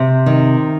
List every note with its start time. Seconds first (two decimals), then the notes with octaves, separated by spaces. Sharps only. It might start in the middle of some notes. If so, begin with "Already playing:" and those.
Already playing: C3
0.26 D#3